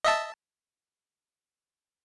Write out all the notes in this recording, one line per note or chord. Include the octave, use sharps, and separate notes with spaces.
D#5 E5 A5